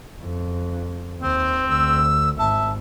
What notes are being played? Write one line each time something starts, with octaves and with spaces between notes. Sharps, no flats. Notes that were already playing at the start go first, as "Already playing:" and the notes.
F2
D#2 C4 C5
D2 E6
G#1 E5 A5